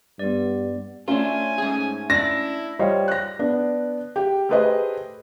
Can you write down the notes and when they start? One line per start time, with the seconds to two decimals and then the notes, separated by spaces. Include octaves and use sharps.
0.19 G2 B3 D5
1.08 A3 C#4 D4 F4 E5 G#5
1.58 G#2 G#4
2.10 D4 E4 A#6
2.79 G3 F4 C5 C#5 D#5
3.08 F#6 A#6
3.39 B3 D4
4.16 G4
4.49 A3 G4 G#4 B4 C5 D#5